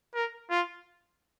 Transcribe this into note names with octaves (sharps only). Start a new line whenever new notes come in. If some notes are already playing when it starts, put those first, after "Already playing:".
A#4
F4